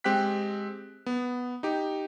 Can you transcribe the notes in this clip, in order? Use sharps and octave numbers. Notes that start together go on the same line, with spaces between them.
G#3 C4 G4 G5 F#6 B6
B3
D#4 G4